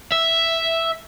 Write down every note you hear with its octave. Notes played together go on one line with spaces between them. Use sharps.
E5